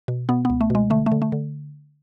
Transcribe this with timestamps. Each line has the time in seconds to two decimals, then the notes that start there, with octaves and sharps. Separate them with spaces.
0.08 B2
0.29 B2 B3
0.45 C#2 B3
0.61 A3
0.70 B2 G#3
0.90 D3 A3
1.06 A3
1.12 D3
1.22 A3
1.32 D3